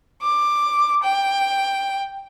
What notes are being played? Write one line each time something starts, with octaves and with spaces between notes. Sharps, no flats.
D6
G5